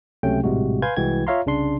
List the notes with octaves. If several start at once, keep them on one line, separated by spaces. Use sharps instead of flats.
C#2 C3 F#3 A3 C#4 G5
A#1 A2 C3 G3 G#3 F#4
B4 F5 G#5 C6 G6 G#6
C2 E3 G#3 F#4 G5 G#6
F4 C#5 E5 F5 A#5 C6
C2 C#3 D4 C6